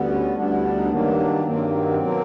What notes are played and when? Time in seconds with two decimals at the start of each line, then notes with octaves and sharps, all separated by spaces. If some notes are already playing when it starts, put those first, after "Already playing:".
Already playing: D2 D3 G3 B3
0.08 C#4
0.35 D2 D3 G3 B3 D4
0.49 E4
0.62 D4
0.77 D#4
0.84 D4
0.90 G2 D#3 F#3 A#3 C#4
1.00 D4
1.44 G2 D#3 F#3 A#3 C4
1.72 C4
1.99 B2 F#3 A#3